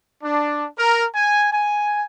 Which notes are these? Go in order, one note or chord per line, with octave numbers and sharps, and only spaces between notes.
D4
A#4
G#5
G#5